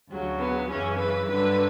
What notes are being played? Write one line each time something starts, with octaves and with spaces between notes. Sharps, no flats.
D2 C#3 F#3
B3
F#2 C#3 E3 C#4
B4
G2 D3 F#3 B4